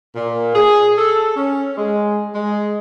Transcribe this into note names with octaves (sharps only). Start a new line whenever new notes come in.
A#2
G#4
A4
C#4
G#3
G#3